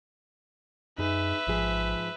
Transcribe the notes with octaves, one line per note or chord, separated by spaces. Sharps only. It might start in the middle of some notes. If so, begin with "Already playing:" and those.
F#2 D#4 G#4 B4 E5
A1 G#2 F3 G#4